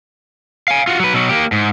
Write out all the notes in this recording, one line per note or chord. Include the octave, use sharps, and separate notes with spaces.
F5 G#5
F4 F#4
F#3 B4
B2 F#3
A#3 G4
G#2